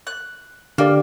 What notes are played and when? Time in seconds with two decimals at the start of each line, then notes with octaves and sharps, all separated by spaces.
0.07 F#6
0.78 D3 A#3 G4 D5